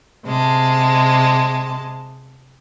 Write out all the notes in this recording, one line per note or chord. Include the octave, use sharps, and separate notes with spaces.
C3 G#3 A5